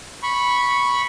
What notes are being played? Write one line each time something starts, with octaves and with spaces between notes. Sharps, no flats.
B5 C#6